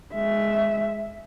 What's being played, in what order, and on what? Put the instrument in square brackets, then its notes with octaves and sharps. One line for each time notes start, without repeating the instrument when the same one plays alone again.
[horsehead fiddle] G#3 E5